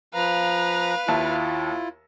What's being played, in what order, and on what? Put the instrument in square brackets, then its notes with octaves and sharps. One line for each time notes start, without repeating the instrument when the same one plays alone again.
[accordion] F3 A#5 [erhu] B4 [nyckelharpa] F5
[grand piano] D#2 E5 A5 [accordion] E4 F4